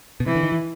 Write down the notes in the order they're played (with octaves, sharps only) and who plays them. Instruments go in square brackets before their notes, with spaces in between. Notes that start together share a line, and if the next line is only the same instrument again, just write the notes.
[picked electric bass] B2
[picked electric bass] C3 [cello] E3
[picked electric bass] D3
D#3
E3